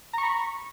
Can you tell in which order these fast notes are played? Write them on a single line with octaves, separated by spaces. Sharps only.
A#5 C#6 B5